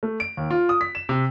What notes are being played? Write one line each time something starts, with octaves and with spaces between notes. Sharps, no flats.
A3
D7
D#2
F4
D#6
B6
E7
C3